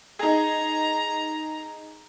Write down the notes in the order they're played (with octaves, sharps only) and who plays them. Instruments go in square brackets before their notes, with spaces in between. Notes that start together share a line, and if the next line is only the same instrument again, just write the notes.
[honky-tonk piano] D#4 G#4 [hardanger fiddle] A#5